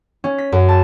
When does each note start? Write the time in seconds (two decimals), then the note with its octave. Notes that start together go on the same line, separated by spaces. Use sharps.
0.24 C#4
0.38 B6
0.52 F#2
0.68 A5